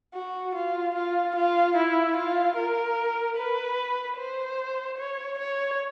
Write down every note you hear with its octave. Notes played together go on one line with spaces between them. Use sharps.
F#4
F4
F4
F4
E4
F4
A#4
B4
C5
C#5
C#5